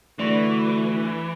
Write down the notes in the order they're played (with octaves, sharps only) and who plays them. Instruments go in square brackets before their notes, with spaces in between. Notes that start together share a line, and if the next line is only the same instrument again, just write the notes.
[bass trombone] D3 [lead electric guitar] E3 [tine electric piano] A3 [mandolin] F#4 B4 D5